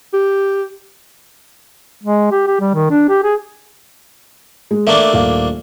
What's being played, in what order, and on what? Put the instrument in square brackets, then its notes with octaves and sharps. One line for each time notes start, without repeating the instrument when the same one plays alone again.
[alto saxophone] G4
[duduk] G#3
G4
G4
G3
D#3
D4
G4
G#4
[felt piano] G#3
[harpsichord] A3 A#3 D4 [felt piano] E5
[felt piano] D#1 F5